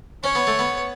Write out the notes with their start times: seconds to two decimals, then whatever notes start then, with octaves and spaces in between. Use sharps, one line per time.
0.23 C#4 C#5
0.35 B3
0.47 A3
0.59 B3